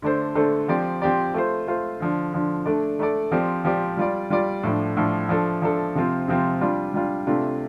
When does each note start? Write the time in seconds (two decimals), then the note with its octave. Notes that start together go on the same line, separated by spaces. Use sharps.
0.02 D3 A3 D4 A4 C5
0.35 D3 A3 D4 A4 C5
0.68 F3 C4 G4 D5
1.02 F3 C4 G4 D5
1.34 A3 F4 C5
1.67 A3 F4 C5
2.00 D3 F3 D4
2.33 D3 F3 D4
2.66 A3 D4 A4 D5
2.99 A3 D4 A4 D5
3.32 F3 C4 G4 D5
3.65 F3 C4 G4 D5
3.97 G3 F4 D5
4.30 G3 F4 D5
4.63 A2 F3 D4
4.97 A2 F3 D4
5.29 F3 D4 A4
5.62 F3 D4 A4
5.95 C3 F3 C4 F4
6.28 C3 F3 C4 F4
6.61 G3 D4 F4
6.94 G3 D4 F4
7.27 C3 A3 D4 F4